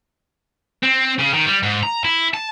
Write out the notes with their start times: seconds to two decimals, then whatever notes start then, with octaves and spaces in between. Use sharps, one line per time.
0.83 C4
1.19 C#3
1.34 D#3
1.46 G3
1.63 G#2
1.83 A#5
2.04 E4
2.34 A5